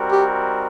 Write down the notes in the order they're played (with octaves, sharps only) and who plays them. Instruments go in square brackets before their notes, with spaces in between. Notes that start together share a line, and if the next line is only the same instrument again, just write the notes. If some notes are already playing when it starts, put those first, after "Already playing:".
Already playing: [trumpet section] G3 C4 D#4 F#4 A#4
[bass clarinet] G4